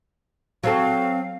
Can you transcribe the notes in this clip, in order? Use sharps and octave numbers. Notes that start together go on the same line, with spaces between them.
F#3 C4 A4 F5